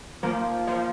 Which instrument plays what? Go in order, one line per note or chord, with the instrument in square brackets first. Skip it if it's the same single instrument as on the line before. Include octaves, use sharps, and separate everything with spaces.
[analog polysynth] F3 [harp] A#3
[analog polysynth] F3